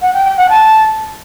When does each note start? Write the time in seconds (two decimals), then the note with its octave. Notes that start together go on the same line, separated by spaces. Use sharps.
0.02 F#5
0.13 G5
0.25 G5
0.37 F#5
0.49 A5